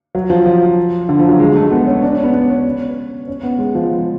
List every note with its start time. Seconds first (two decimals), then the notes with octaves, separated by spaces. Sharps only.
0.15 F#3
0.30 F3
0.46 F3
1.09 D3
1.19 F3
1.29 F#3
1.40 G#3
1.56 A3
1.71 B3
1.87 C#4
2.02 D4
2.13 C#4
2.24 B3
2.34 B3
2.49 C#4
3.28 C#4
3.43 B3
3.59 G#3
3.75 F3